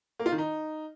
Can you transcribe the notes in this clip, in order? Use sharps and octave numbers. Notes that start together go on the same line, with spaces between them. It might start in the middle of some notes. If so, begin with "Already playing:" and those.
A#3
F4
D#3
D#4